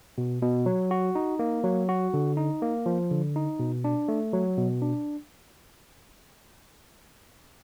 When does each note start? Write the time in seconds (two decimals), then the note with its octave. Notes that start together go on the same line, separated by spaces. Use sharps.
0.18 B2
0.42 B2
0.66 F#3
0.91 F#4
1.15 D#4
1.39 A#3
1.64 F#3
1.89 F#4
2.14 D3
2.37 D#4
2.62 A#3
2.86 F3
3.11 D3
3.36 D#4
3.59 B2
3.84 D4
4.08 A3
4.33 F#3
4.57 B2
4.82 D4